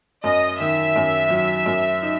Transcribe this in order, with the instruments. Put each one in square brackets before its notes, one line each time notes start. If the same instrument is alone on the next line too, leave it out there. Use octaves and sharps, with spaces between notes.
[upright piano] F#2 [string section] D#5
[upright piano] D#3 [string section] E5
[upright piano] F#2
F#3
F#2
D#4